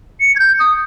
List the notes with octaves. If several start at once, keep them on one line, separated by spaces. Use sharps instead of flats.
C#7
G#6
G6
D#6